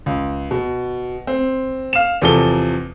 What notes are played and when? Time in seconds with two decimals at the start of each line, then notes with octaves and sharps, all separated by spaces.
0.06 C#2
0.51 B2
1.27 C4
1.93 F5 E7
2.22 E2 C3 F3 A4 G7